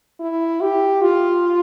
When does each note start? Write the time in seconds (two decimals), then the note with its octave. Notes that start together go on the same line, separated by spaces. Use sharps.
0.20 E4
0.61 G4
1.02 F4